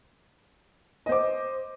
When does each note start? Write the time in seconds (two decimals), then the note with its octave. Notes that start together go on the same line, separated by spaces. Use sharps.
1.06 D#5
1.09 C5
1.12 D6